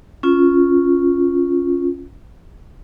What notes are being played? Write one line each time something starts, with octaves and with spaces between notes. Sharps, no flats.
C#4 F4